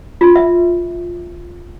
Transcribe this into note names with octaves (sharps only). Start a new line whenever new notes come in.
F4
E5